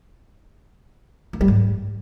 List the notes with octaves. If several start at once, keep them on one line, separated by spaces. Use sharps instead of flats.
A#3
G3
G#2